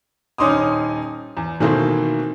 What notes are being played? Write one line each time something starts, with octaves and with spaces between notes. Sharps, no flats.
D#1 C#4 D#4 C6 D6 D#6
E2
B2 D#3 E3 A3 A#3 C4